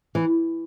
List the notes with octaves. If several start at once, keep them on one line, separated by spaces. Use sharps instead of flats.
E3